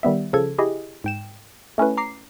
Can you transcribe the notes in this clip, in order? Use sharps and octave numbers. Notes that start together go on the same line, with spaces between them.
D#3 G3 B3 E5
C#3 F3 A4 G#6
E4 G4 G#4 D#5
G#2 G5 E7
A3 C#4 E4 B4
A#5 D6 C7